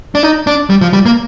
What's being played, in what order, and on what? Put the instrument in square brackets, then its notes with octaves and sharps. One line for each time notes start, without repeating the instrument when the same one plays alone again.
[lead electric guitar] D4
D#4
D4
G3
F3
G3
A#3